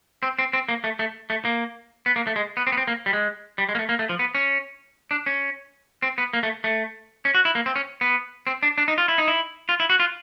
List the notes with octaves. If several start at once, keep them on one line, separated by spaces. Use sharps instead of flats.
C4
C4
C4
A#3
A3
A3
A3
A#3
B3
A#3
A3
G#3
B3
C4
B3
C4
A#3
G3
G#3
G3
G#3
A#3
A3
A#3
A3
F3
B3
C#4
D4
C#4
C4
B3
A#3
A3
A3
C#4
F#4
E4
A#3
C4
C#4
B3
C4
D4
D4
D#4
F4
E4
D#4
E4
F4
E4
F#4
F4